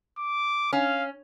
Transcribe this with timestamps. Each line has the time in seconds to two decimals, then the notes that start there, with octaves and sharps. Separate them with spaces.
0.18 D6
0.73 C#4 F5